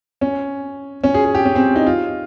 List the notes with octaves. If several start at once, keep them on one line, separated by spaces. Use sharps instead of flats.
C#4
C#4
G#4
G#4
G4
C#4
C4
D#4
F4